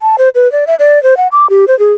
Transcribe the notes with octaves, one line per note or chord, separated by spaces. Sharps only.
A5
C5
B4
D5
E5
D5
C5
F#5
D6
G4
C5
G#4